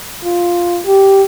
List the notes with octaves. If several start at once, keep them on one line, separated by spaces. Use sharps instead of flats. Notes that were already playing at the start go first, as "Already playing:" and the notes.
F4
G4